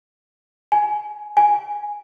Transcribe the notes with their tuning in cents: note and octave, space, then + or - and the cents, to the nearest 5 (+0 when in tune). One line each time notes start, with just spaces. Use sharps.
G#5 +15
G#5 -5